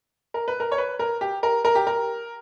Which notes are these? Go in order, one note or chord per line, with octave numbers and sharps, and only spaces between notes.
A#4
B4
A#4
C#5
B4
A#4
G4
A#4
A#4
G4
A#4